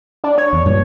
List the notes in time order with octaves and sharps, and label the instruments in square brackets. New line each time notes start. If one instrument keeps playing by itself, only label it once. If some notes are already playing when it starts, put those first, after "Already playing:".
[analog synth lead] D4
C#5
[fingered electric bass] E2
G2 A#2